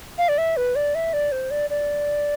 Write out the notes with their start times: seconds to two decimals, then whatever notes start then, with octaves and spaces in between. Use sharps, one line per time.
0.18 F5
0.29 D5
0.38 E5
0.57 B4
0.76 D5
0.95 E5
1.13 D5
1.32 C5
1.51 D5
1.70 D5